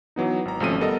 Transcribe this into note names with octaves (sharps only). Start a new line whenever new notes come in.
E3 F#3 B3 D#4
G#1 A#5
G#1 C3 F3 A3 C#4 D#7
G3 B3 A4 A#4 D#5